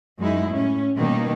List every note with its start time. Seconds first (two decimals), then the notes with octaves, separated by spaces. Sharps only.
0.19 F#2 G#3 D#4 E4
0.50 A2 C#4
0.97 B2 D#3 G3 A#3 D#4